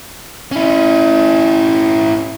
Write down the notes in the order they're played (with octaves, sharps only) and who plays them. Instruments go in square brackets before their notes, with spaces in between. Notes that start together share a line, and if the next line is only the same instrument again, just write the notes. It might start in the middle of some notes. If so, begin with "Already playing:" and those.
[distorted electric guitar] C#4 E4